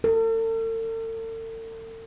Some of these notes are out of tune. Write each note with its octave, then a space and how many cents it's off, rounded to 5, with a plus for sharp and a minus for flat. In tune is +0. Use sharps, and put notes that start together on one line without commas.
A4 +45